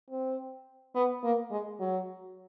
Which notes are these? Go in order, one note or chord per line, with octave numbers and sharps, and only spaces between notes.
C4
B3
A#3
G#3
F#3